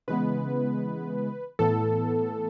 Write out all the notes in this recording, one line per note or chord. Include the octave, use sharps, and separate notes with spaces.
C#3 E3 G#3 B3 B4
A2 E3 B3 A4